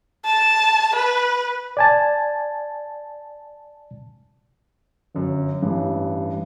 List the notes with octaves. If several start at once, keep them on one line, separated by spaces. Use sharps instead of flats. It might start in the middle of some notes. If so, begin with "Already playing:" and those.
A5
B4
D5 G#5 A5
G1 F#2
A1 G2